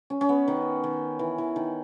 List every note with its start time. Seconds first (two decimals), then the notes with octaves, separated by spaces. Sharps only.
0.10 C#4
0.21 C#4
0.29 B3
0.48 D#3
0.84 D#3
1.19 E3
1.38 E3
1.56 D#3